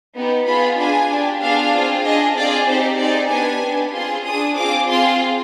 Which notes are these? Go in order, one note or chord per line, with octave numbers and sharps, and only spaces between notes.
B3 D#4 G4
B3 F4 G#4 B5
D4 F4 G#4 G#5
D4 G4
B3 D4 F4 G#4 F5
C4 F4 G#4
D4 G#4 D#5
C4 F4 G#4 D5
C4 D#4 G4 C5
C4 D#4 G#4 D5
B3 D4 G4 G#5
B3 D4 G4
C4 F4 G#4 C6
D4 G#4 D#6
C4 F4 G#4 D6
C4 F4 G#4 C6